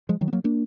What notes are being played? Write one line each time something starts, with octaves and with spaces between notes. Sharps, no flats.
F3 G#3
D#3 F#3
B3
F#3 A#3
A#3 D4